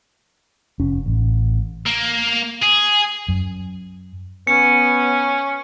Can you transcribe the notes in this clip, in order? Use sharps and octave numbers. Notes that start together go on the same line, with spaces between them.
F1 C#4
A1
A#3
G#4
F#2
B3 C#4 C#7